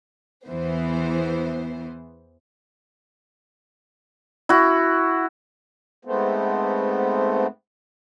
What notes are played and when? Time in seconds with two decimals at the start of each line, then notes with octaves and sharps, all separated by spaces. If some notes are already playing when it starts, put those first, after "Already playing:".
0.47 E2 E3 B3 C5
4.49 E4 F#4
6.05 G#2 A3 B3 C4